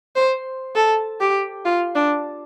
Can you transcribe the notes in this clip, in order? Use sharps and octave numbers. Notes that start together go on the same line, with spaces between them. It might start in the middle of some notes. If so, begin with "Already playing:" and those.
C5
A4
G4
F4
D4